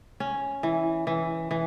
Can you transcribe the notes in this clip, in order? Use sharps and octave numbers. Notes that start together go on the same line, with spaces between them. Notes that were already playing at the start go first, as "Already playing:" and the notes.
C#4
E3
E3
E3